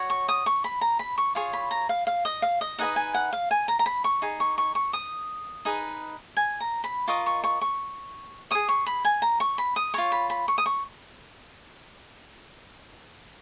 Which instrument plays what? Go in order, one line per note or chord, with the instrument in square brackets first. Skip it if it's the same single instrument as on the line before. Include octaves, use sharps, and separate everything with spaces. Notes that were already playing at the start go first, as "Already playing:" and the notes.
Already playing: [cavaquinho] F#4 C#5
C#6
D#6
C#6
B5
A#5
B5
C#6
F4 G#4 C#5 C#6
B5
A#5
F5
F5
D#5
F5
D#5
D#4 G#4 B4 D#5 F#5
G#5
F#5
F5
G#5
A#5
A#5
B5
C#6
D#4 G#4
C#6
C#6
C#6
D#6
D#4 G#4 B4
G#5
A#5
B5
F4 A#4 D#5 C#6
C#6
C#6
C#6
G#4 C#5 D#6
C#6
B5
G#5
A#5
C#6
B5
D#6
F4 A#4 C#5 C#6
B5
B5
C#6
D#6
C#6